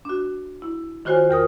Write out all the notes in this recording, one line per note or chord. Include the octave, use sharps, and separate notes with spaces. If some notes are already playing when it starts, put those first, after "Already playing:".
D4 F#4
E4
D#3 F4 F#4 C5 C#5 G#5
E2 F4 A#4 D#6